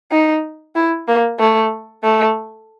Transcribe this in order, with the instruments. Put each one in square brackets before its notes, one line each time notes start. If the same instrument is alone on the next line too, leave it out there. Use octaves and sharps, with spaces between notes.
[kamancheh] D#4
E4
A#3
A3
A3